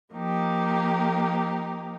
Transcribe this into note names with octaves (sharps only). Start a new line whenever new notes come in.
F3 A#3 D#4 G4